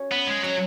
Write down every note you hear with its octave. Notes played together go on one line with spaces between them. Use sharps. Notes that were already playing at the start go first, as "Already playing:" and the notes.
Already playing: C#4 F#4
B3
G#3
F#3 C#4